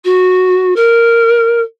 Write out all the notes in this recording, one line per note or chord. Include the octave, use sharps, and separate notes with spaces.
F#4
A#4